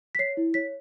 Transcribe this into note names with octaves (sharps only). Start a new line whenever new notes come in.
B6
C#5 C7
E4
C#5 B6